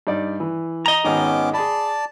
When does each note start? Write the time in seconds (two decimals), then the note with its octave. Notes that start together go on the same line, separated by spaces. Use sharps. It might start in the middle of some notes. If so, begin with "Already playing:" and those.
0.07 G2 D#4 D5
0.40 E3
0.86 D#5 A#5
1.04 G#1 D#3 B3 C#4 D6
1.54 G#4 D5 A5 B5